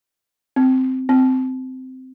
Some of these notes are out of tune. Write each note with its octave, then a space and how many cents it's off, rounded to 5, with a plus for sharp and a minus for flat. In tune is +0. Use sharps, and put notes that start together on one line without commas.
C4 -10
C4 -15